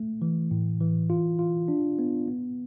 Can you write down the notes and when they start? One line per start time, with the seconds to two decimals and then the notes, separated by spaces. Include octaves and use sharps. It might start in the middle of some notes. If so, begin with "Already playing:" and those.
Already playing: A3
0.22 E3
0.51 A2
0.80 E3
1.10 F4
1.39 F4
1.68 D4
1.99 B3
2.28 B3